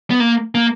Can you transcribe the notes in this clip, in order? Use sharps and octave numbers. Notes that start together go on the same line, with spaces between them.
B3
A#3
A#3